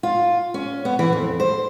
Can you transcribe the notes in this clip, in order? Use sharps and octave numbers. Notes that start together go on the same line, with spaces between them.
F4
C#4
B3
E3
F2
C5